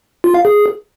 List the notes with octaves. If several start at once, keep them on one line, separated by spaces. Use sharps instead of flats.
F4
F5
G#4